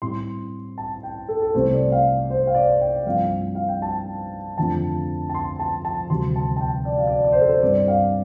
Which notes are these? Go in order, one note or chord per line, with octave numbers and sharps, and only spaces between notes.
A2 G3 C4 C6
A5
G5
A4
A4
C2 C3 A3 C4 C5
D5
F5
C5
F5
D5
G5
G2 F3 A3 C4 F5
F5
G5
A5
F2 D3 F3 A3 C4 A5
A5
C6
A5
A5
D2 C3 G3 C6
A5
A5
G5
D5
F5
D5
D5
C5
A4
C5
G2 G3 C4 D5
F5